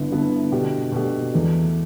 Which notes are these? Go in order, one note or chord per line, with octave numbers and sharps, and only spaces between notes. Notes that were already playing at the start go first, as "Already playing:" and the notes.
Already playing: G1 G2 D3 B3 E4
G1 G2 D3 B3 E4
B2 A3 D4 G4
B2 A3 D4 G4
E2 E3 A3